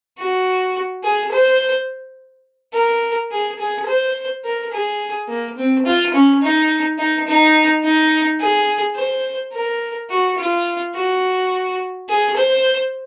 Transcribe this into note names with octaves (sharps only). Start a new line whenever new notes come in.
F#4
G#4
C5
A#4
G#4
G#4
C5
A#4
G#4
A#3
C4
F4
C#4
D#4
D#4
D#4
D#4
G#4
C5
A#4
F#4
F4
F#4
G#4
C5